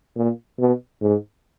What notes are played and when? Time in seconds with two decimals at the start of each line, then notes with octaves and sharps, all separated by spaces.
0.16 A#2
0.59 B2
1.02 G#2